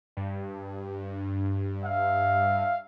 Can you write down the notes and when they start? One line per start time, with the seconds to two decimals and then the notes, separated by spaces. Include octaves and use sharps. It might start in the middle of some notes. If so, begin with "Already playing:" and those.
0.17 G2
1.83 E5 F5